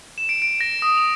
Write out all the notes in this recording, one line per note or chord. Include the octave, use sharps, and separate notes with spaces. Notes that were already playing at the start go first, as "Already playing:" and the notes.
E7
D7
D7
A#6
D#6
F7